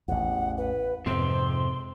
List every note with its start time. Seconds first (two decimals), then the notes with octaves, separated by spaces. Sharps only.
0.08 A1 E2 F#5
0.58 B4
1.06 F2 G#2 C3 F3 C4 C6